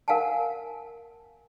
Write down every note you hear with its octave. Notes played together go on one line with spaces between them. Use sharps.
A#4 F5 F#5 G#5 A5